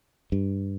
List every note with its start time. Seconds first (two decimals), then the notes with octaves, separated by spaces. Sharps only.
0.32 G2